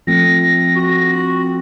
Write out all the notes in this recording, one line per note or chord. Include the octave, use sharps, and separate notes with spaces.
F3 A3 C4 A#6
F#4